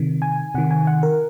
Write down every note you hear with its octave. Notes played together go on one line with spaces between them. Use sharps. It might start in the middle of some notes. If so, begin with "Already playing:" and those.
Already playing: C3 D#3
G#5
C3 D#3 F#5
G#5
F#5
A#4